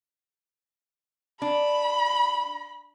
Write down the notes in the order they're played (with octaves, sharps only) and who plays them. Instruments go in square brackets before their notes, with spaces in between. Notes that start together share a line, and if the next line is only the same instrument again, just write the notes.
[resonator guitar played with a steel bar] D4 [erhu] B5